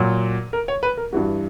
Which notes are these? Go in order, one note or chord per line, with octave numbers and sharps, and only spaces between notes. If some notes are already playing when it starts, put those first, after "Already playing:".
Already playing: A#2 F#3
A#4
C#5
B4
A#4
G2 E3 G3 F#4